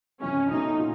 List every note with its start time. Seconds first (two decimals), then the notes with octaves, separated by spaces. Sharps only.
0.21 G1 F2 C3 E3 C#4
0.51 B1 B2 F#3 A3 D#4
0.79 A#2